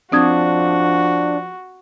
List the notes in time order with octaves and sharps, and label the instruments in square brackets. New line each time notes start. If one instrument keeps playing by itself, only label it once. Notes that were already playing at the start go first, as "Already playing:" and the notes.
[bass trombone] F3 [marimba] C4 D#6 G#6 [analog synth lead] D4 [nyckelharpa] F#4